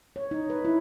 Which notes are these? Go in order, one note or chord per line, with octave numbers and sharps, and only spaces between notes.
C#5
D#4
B4
E4